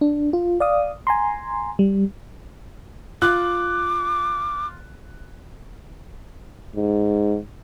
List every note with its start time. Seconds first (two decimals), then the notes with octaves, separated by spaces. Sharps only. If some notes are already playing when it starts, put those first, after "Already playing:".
0.01 D4
0.33 F4
0.60 D5 F5 D#6
1.07 G#5 A#5 C6
1.79 G3
3.22 F4 D6 F#6
6.76 G#2